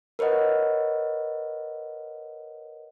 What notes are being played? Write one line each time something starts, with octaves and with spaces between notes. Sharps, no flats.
A#4 B4 C#5 D#5 F#5